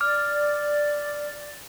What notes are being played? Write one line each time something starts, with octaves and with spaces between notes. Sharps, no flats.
D5 D6 F6